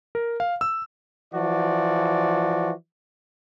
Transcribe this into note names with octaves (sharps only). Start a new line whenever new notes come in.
A#4
F5
E6
E3 F3 F#4 D5